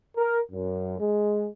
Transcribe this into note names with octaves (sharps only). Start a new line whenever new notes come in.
A#4
F#2
G#3